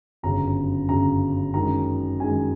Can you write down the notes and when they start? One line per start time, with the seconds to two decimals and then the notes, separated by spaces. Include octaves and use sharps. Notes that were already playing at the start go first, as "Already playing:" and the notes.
0.23 G1 F#2 C#3 A#5
0.89 G1 F#2 C#3 A#5
1.54 F#2 D#3 G#3 A#5
2.20 F#2 D#3 G#3 G#5